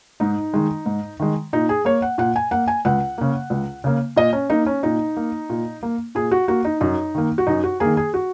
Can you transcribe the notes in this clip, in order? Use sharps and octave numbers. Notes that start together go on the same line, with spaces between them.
G#2 D#4
D#3 G#3
G#2
D#3 G#3
A#2 D#4
G#4
A#3 C#5
F#5
A#2 F#5
G#5
A#3 F#5
G#5
C#2 F#5
C#3 A#3
C#2
C#3 A#3
A#2 D#5
C#4
A#3 D#4
C#4
A#2 D#4
A#3
A#2
A#3
A#2 G#4
F#4
A#3 F#4
D#4
F#2 D#4
D#3 A#3
F#4
F#2 D#4
F#4
D#3 A#3 G#4
G#4
F#4